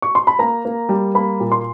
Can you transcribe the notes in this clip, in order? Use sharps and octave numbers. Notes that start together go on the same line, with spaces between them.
C#6
C6
B5
A#3 A#5
A#3
G3
A#3 B5
A#2
C6